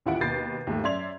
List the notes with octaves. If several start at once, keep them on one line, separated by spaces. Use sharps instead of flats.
A1 D#2 E4 F4 F#5 D7
D#2 B2 B4 G6 A6 C7
D#2 G#2 A3
F#2 D5 E5 C6 G#6 F7